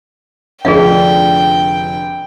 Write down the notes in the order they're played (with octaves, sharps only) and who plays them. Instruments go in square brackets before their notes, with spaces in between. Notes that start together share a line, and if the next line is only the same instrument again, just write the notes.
[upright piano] F1 D3 F3 [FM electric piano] D4 [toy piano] G#4 D5 F5 [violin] G5